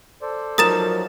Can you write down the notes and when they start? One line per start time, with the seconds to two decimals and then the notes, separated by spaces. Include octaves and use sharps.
0.22 A4 C5 D5
0.58 F3 F#3 D#4 A#4 D#6 A6 E7